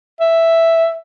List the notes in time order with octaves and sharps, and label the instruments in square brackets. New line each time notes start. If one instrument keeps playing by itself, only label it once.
[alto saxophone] E5